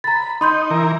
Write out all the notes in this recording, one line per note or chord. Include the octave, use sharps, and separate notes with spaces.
A#5 B5 A6
D#4 B5 C6 G6
E3 A#4